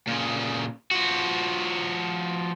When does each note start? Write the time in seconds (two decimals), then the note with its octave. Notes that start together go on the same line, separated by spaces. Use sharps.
0.08 A#2 C#3
0.91 F3 F#4